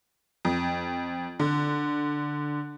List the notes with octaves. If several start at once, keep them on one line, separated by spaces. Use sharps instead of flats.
F2
D3